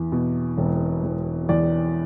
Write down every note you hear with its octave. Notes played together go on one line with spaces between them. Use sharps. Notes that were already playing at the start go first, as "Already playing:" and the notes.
Already playing: E2
B2
E1
E1
E2 D5